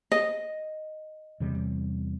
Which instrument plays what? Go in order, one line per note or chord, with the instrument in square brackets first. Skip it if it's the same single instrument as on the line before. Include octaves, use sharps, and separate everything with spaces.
[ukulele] D#5
[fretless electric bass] E2 C3 G3